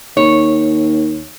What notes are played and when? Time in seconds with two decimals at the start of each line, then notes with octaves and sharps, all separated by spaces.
0.17 D#2 C#5